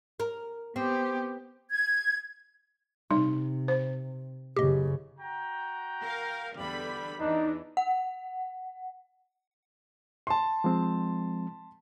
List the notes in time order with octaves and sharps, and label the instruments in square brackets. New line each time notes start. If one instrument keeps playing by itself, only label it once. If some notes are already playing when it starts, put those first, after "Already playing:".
[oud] A#4
[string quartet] B3 G4 [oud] C4
[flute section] G#6
[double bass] C3 [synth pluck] G3 [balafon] D#4
[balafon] C5
[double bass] F#1 C#3 [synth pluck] G4 D#5
[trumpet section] F#4 G5 A#5
[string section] A#4 F5
[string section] E2 D3 B5 [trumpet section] G3
[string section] E2 E3 [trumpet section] D4 [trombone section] D#4
[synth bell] F#5
[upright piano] A5 C6
[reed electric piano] F3 G#3 C4